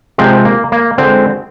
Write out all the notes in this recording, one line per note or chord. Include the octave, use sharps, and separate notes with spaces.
C3 F3 G#3 C4
A#3
A#3
D3 F3 G#3 C4